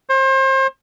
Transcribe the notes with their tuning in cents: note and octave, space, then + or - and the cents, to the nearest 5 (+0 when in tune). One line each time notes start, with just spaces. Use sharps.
C5 +35